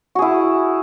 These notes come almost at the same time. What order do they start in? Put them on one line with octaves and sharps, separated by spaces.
F#4 G#4 E4